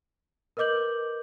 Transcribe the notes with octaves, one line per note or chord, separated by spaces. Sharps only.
A#4 B4 D#5 D6 G6 F#7